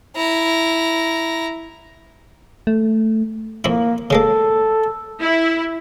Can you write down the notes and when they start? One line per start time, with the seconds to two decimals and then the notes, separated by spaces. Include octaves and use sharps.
0.16 E4 A#5
2.67 A3
3.64 F2 A#3 E4
4.10 C#3 G#3 A#3 A4
5.21 E4